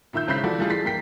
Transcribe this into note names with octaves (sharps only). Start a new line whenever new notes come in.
A#2 D#3 E5 E6 G6
G#1 C#3 E4 B5 G6 B6
E3 F3 F#4 A4 D5
E3 F3 G3 A3 F4 G#4
A6 B6 C7
E3 A#3 G5 B6